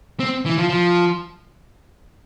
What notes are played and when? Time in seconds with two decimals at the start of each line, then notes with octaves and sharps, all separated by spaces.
0.20 C4
0.46 E3
0.58 F3
0.69 F3